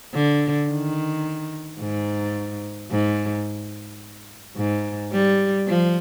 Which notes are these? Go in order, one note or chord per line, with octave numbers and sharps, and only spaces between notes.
D3
D#3
G#2
G#2
G#2
G3
F3